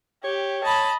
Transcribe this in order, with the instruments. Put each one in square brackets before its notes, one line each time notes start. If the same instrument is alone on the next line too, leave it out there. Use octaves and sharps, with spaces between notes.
[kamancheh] G4 [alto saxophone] C#5
[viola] D#5 B5 [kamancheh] A5